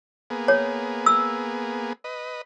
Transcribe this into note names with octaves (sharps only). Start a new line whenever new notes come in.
A#3 B3 G#4
C#5
E6
B4 D#5